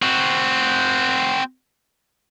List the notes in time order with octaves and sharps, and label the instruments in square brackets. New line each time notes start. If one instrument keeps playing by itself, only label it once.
[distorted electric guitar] C4 F#4